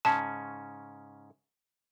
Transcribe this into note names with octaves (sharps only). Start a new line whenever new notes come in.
G#2 C#3 C#4 A5